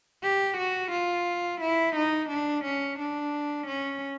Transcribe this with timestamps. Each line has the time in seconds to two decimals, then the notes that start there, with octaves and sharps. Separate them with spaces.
0.23 G4
0.58 F#4
0.92 F4
1.61 E4
1.96 D#4
2.30 D4
2.64 C#4
2.99 D4
3.67 C#4